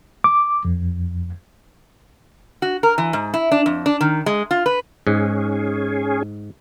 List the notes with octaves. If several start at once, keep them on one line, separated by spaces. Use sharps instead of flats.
D6
F2
F#4
A#4
E3
G#2
E4
D4
F2
D4
D#3
G#3
F4
B4
G#2 C#4 G#4